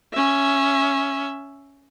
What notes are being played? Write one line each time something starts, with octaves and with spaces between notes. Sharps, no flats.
C#4 E5